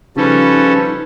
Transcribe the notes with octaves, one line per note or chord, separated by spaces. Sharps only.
C#3 F3 G3 C#4 D#4 A4 B4